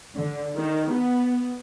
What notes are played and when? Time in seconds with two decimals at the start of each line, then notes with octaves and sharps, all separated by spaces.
0.15 D3
0.57 D#3
0.92 B3